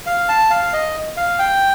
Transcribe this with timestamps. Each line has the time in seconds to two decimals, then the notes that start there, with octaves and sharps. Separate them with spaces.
0.06 F5
0.29 A5
0.51 F5
0.73 D#5
1.17 F5
1.39 G5